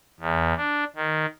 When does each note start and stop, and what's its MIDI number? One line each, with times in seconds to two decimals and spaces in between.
0.20 0.54 40
0.57 0.84 62
0.96 1.26 51